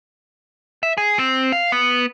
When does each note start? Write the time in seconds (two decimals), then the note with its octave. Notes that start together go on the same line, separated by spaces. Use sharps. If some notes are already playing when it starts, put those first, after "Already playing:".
0.83 E5
0.97 G#4
1.19 C4
1.52 F5
1.72 B3